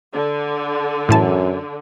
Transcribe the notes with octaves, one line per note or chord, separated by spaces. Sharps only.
D3
F#2 A2 E3 A5